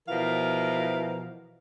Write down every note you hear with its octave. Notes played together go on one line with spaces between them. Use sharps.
B2 E3 F3 A#4 F5